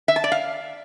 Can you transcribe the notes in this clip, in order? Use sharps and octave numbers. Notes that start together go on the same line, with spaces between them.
E5
A5
D5
F5